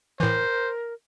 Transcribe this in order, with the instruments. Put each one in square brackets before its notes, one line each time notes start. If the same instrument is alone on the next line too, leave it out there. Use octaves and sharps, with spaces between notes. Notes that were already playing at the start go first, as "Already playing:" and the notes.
[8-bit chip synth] A2 E3 [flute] A#4 [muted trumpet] C5